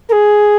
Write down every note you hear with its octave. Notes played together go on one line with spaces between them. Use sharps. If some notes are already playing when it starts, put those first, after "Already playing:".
A#4
G#4